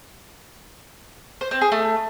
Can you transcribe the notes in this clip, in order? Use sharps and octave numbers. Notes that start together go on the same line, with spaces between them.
C5
C4
G#4
A3